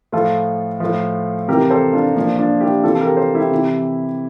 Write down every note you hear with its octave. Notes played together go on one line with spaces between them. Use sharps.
A2 F3 F4 A4
A2 F3
C3 E3 G4 A#4
A4 C5
D4 F4
A#2 F3 D4
D4 F4
E4 G4
C3 E3 F4 A4
A4
G4 A#4
A4 C5
E4 G4
C3 E3